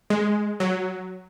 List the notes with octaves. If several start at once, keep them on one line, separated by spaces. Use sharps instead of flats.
G#3
F#3